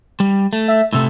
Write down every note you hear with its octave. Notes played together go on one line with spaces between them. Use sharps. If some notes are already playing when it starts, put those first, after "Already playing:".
G3
A3
E5
A2 C3 A3 E6